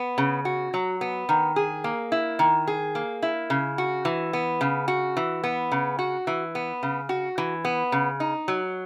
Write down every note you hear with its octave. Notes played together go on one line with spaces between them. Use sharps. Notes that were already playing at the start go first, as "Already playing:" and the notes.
Already playing: B3
C#3
F#4
F#3
B3
D#3
G#4
A#3
E4
D#3
G#4
A#3
E4
C#3
F#4
E3
B3
C#3
F#4
E3
B3
C#3
F#4
E3
B3
C#3
F#4
E3
B3
C#3
D#4
F#3